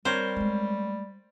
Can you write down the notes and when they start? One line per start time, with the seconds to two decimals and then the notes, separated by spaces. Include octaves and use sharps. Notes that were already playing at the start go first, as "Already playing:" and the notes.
0.05 G3 C4 A#4 C5 C#5
0.36 G#3 A3